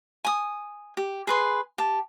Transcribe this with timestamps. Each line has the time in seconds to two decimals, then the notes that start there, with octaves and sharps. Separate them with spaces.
0.25 G#5 D#6
0.97 G4
1.27 G#4 B4 C6
1.78 G4 A5